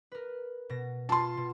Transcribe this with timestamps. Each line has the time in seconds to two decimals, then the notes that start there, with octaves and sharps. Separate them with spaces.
0.12 A#4 B4
0.69 B2 A#6
1.09 F4 A5 C6
1.37 B2